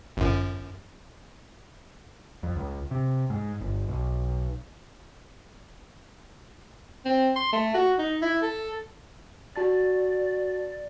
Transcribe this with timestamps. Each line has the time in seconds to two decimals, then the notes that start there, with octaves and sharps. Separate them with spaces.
0.17 G1 F#2
2.43 F2
2.56 C#2
2.91 C3
3.30 G#2
3.61 G1
3.89 B1
7.05 C4
7.36 C6
7.53 A3
7.74 F#4
7.98 D#4
8.22 E4
8.42 A4
9.56 F#4 D5 A5 A6